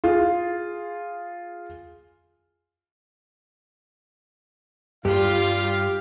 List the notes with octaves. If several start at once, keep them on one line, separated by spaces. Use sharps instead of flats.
F4 G#4
G2 G3 F4 G4 F5